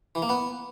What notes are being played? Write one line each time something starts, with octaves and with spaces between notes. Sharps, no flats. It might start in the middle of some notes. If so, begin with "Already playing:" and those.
E3
A#3
B3